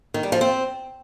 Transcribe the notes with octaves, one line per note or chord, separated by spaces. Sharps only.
D#3
G3
F3
C4